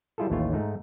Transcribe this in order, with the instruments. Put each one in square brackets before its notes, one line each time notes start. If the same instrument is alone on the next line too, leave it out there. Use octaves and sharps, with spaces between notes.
[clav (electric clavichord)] G3 E4 F4 G#4 A4
A1 D#2 A2 A3 F4 C#5
G#2 A3 D#4